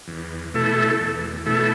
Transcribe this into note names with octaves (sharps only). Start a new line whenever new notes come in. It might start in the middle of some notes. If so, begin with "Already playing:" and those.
E2
B2 A3 E4 A4
E2
B2 A3 E4 A4